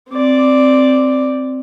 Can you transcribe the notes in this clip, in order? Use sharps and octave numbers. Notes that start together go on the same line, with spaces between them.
C4 D5